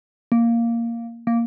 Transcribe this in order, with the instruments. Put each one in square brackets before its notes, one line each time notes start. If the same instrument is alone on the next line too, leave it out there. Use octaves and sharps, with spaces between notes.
[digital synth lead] A#3
A#3